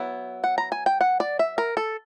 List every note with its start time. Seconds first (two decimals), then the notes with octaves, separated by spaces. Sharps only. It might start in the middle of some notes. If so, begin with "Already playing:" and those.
Already playing: F#3 B3 E4
0.44 F#5
0.58 A#5
0.72 G#5
0.86 G5
1.01 F#5
1.20 D5
1.39 E5
1.58 A#4
1.77 A4